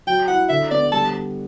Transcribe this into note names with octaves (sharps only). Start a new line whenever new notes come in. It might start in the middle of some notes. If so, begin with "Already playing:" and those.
F#3 G5
E4 F#5
D3 E5
B3 D5
G3 A5